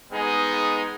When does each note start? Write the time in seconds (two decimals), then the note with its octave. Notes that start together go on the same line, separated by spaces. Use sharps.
0.12 G#3 B3 D#4 G#4